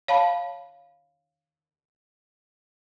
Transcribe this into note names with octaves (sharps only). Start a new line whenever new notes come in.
C#5 F5 A5 B5